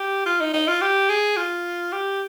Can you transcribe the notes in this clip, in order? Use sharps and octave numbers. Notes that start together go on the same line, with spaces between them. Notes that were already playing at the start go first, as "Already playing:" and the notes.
Already playing: G4
F4
D#4
D#4
F4
G4
G#4
F4
G4